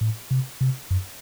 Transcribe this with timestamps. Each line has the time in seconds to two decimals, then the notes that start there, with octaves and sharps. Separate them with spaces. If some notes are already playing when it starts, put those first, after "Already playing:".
0.01 A2
0.31 C3
0.61 C3
0.91 F#2